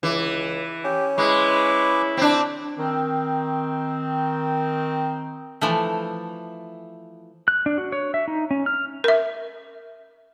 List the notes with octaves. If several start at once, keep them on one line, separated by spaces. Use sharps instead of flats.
C#2 E3
C#4 G4
G#3 E4 B4 C#6 D6
C4 D4
D#3 C4
E3 F3 A3
F#6
D4
F#4
C#5
E5
D#4
C#4
F6
A#4 E5